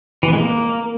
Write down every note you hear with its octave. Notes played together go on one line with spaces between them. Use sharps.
E3
B3
G#3
A#3